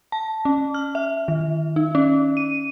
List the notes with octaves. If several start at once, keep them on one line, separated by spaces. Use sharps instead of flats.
A5
C#4
F6
E5
D#3
D#4
C#4
D#7